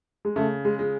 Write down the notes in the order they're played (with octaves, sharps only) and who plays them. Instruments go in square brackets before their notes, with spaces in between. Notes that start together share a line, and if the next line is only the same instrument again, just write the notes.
[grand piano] G#3
[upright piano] C#3 [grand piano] A3
[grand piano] G#3
[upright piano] G#3